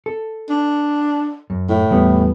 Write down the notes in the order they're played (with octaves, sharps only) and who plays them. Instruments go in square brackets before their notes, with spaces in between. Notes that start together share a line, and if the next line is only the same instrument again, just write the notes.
[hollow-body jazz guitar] A4
[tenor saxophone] D4
[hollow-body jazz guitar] F#2
[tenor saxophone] A2
[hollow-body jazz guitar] E2 G3 B3